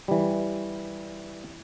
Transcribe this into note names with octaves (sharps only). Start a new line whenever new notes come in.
E3 G3